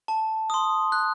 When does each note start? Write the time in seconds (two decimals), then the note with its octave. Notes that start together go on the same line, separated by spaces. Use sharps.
0.08 A5
0.50 C6 D#6
0.92 F#6